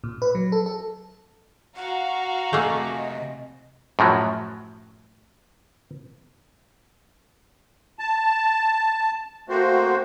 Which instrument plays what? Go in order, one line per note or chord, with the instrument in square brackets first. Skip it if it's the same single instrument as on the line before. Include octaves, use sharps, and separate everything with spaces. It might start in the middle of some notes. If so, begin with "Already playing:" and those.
[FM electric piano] A#2
B4
F#3
A4
A4
[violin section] F#4 F5 A#5 [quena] F#5
[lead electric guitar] C3 G#5 [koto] A3 A#3 [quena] D#5
[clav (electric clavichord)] F#2 A2 F3 F#3
[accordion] A5
A3 A#3 C4 F#4 C5